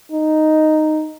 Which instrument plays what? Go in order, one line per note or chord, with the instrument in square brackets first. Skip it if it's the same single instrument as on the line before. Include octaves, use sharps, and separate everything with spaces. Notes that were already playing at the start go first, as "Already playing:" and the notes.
[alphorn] D#4